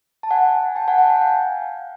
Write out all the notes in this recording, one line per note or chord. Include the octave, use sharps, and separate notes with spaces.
A5
F#5 G#5
G5 A5
F#5 G#5
G5 A5
F#5 G#5
F5 G5